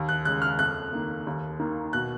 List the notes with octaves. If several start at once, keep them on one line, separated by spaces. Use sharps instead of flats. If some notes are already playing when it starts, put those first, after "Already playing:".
Already playing: D#2
F#6
C#3 G#3 F#6
F6
F2 F#6
D#3 A#3
D#2
D#3 A#3
B2 F#6